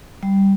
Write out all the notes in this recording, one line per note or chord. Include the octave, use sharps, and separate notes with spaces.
G3